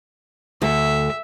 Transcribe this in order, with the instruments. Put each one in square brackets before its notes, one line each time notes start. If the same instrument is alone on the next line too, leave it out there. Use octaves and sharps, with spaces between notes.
[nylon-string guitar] D2 A4 [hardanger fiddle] E5